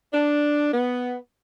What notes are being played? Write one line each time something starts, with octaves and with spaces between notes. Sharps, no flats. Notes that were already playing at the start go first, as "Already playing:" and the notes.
D4
B3